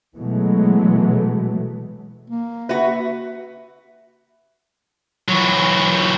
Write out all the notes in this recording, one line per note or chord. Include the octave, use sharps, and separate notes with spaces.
B2 E3 F#3 G#3 A3
A#3
F#4 B4 E5
E3 F#3